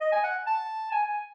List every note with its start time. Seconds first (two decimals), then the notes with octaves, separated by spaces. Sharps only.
0.01 D#5
0.12 G#5
0.24 F#5
0.47 A5
0.92 G#5
1.04 G#5